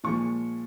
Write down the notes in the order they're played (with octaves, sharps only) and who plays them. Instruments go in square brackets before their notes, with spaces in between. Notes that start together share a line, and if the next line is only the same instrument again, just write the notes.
[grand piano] A#2 F3 G#3 C#6